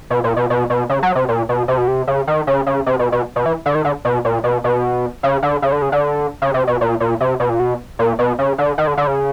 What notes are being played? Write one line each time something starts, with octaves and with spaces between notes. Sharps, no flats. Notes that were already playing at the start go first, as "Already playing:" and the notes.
B2
A#2
B2
B2
B2
C#3
F#3
C3
A#2
B2
C3
B2
C3
C#3
D#3
C#3
C#3
C3
B2
B2
B2
E3
D3
D#3
D3
B2
A#2
B2
B2
C#3
D3
C#3
D3
C#3
D3
C#3
C3
B2
A#2
A#2
C3
B2
A#2
B2
A#2
B2
C#3
D3
D#3
D3
D3
C#3